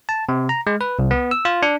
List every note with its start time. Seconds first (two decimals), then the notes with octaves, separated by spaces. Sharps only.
0.09 A5
0.29 C3
0.49 A#5
0.67 G#3
0.81 B4
0.99 C2
1.11 B3
1.31 E6
1.45 F4
1.62 D4